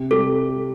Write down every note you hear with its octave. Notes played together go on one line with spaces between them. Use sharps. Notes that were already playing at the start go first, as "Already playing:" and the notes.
Already playing: C3
G3 A4